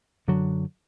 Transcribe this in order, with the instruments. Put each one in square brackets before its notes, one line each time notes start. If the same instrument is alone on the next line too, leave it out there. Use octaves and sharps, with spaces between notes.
[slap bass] F#2 D3 F#3